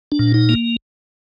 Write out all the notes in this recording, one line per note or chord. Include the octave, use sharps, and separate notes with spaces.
D4
A#2
D#4
A#3